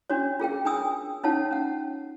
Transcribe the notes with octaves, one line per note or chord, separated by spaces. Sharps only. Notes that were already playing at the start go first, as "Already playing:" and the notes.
C#4 D4 F#4 C#5
F4 G#4 A#4 G5
D4 G5 G#5 D#6 E6
C#4 D#4 F4 C#5 F#5 A5
C#4 F#5